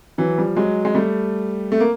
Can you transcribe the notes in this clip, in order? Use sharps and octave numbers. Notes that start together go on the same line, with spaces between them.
E3 F#3
F3 G3
F#3 G#3
G#3
G3 A3
A3
A#3